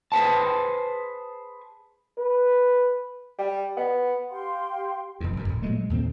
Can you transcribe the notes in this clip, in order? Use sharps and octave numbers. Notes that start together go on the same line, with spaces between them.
G#4 B4 C5 A5
B4
G3
B3
G4 F5 G5 C6
F1 E2
G1 F#2 A2
D1
A#2 F#3 G#3 A3
G#3
D#2 A#2 D3 C4